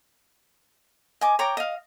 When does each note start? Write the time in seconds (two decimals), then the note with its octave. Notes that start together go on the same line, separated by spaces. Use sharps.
1.21 D#5 G#5 D6
1.39 C#5 G5 A#5 D6
1.57 D#5 F5